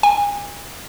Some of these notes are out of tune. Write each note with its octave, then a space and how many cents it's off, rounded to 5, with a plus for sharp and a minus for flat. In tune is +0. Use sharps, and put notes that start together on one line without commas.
G#5 -35